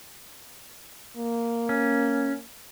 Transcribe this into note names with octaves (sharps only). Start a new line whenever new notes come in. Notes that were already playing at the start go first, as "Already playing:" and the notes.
A#3
C#4